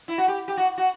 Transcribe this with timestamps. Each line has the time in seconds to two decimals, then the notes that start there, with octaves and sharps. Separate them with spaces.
0.08 E4
0.18 F#4
0.28 G4
0.48 G4
0.57 F#4
0.78 F#4